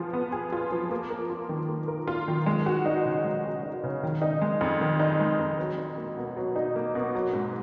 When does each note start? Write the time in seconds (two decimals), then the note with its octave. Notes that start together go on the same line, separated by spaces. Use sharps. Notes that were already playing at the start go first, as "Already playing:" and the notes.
Already playing: F3 B3 F4 G#4
0.13 B3
0.32 G#4
0.52 F4
0.72 F3
0.91 A#3
1.10 A#4
1.30 F4
1.49 D#3
1.69 A#3
1.88 A#4
2.07 F4
2.28 D#3
2.46 G#3
2.66 F#4
2.86 D#4
3.05 C#3
3.24 G#3
3.45 F#4
3.63 D#4
3.84 C#3
4.03 D#3
4.22 D#4
4.42 G#3
4.61 F2
4.81 D#3
4.99 D#4
5.20 G#3
5.39 F2
5.59 F#3
5.78 D#4
5.97 A#3
6.17 B2
6.37 F#3
6.56 D#4
6.76 A#3
6.95 B2
7.15 F#3
7.33 G#2